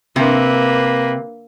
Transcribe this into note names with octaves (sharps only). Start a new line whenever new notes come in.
C3 A#3 B4